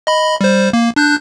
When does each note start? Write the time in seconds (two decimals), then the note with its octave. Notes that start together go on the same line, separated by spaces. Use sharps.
0.07 D#5 B5
0.41 G3 C5
0.73 A#3
0.96 D4 F#6 G6